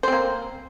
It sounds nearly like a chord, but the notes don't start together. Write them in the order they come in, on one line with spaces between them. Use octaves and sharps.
C5 C4 A#3